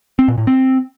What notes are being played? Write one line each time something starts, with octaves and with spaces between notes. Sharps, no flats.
C4
A#2
A2
C4